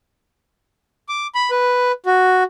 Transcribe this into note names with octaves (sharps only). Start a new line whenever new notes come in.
D6
B5
B4
F#4